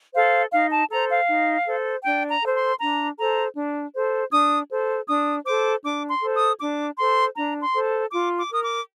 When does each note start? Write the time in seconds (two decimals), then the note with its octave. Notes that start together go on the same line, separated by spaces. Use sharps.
0.14 A4 C5 F5
0.52 D#4 F5
0.71 A5
0.90 A4 C5 A#5
1.09 F5
1.27 D#4
1.65 A4 C5
2.04 D4 G5
2.29 A#5
2.42 A4 C5
2.55 C6
2.80 D4 A#5
3.17 A4 C5 A#5
3.55 D4
3.94 A4 C5
4.31 D4 D#6
4.69 A4 C5
5.07 D4 D#6
5.45 A4 C5 D6
5.84 D4 D6
6.09 C6
6.22 A4 C5
6.34 D#6
6.59 D4 D6
6.97 A4 C5 C6
7.35 D4 A#5
7.60 C6
7.74 A4 C5
8.11 F4 D6
8.36 D6
8.49 A#4 D#6
8.62 D6